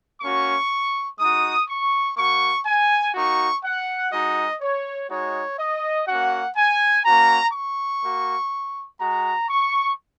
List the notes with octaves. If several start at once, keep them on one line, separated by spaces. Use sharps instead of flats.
A#3 C#4 F#4 C#6
G#3 D#4 F#4 D#6
C#6
A#3 F#4 C#6
G#5
A#3 D#4 F#4 C#6
F#5
G#3 D#4 F#4 D#5
C#5
G#3 D#4 F#4 C#5
D#5
A#3 C#4 F#4 F#5
G#5
A#3 C#4 F#4 A#5
C#6
A#3 F#4
G#3 F#4 A#5
C#6